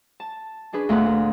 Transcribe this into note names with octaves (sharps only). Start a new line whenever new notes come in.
A5
C#4 D4 G#4 B4
D2 A#2 A3 B3 D#6 F#6